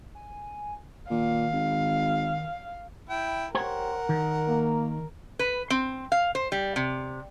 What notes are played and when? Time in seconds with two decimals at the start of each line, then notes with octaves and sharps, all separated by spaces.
0.15 G#5
1.10 A#2 D#3 F5
1.53 G#1
3.09 E4 G5
3.55 G4 A#4 C5 C#5 F#5
4.09 D#3
4.48 A#3
5.39 B4
5.70 C4
6.12 F5
6.35 C5
6.52 G3
6.76 C3